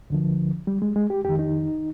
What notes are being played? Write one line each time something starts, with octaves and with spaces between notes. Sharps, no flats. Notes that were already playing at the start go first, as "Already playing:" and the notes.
D2 D3 F3
G3
G#3
G#3
G4
F2 D#3 G4
D#4